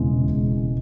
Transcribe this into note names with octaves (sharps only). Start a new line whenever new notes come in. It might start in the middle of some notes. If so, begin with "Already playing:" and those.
Already playing: E1 E2 C#3 E3 G#3
E1